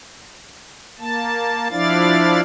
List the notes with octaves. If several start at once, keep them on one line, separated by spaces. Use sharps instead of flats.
A#3 A5
F3 D4 E4 D5 F5 A6